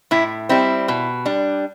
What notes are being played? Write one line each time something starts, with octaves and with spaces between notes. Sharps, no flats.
A2 E4
G3 C4 E4
B2
G3 D4